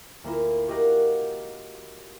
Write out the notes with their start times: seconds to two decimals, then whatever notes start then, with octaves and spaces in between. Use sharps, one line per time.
0.24 D2 A#3 E4 F4 E7
0.68 F#4 G4 A#4 D#5 F5 F#5